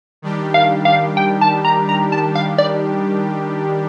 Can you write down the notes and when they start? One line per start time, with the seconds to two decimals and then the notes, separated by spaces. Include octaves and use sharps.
0.22 D#3 G3 D4 G4
0.54 F5
0.85 F5
1.17 G5
1.41 A5
1.65 A#5
1.89 A#5
2.12 A5
2.35 F5
2.58 D5